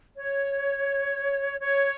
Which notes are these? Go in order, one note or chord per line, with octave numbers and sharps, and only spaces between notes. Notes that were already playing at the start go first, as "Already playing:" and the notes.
C#5
C#5